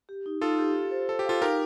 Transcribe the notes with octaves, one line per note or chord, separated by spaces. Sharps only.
G4
D#4
D#4 F4 A4
G4
G4
C5
A4 C5
G4
F4 A4 F5
D#4 G4 A#4